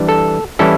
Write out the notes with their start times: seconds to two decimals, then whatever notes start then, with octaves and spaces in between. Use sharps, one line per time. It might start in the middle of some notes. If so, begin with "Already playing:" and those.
Already playing: E3 G3 D4
0.09 A4
0.59 E3 G3 C#4 E4 A4